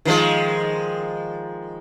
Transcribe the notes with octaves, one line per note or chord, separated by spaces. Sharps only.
D#3 F3 G#3